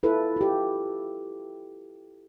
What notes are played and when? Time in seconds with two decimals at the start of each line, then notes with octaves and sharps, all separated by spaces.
0.03 E4 F4 A4 B4
0.37 F4 G4